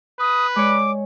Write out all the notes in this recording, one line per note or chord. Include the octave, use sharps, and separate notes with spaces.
B4 D#6
G#3 C#5 D6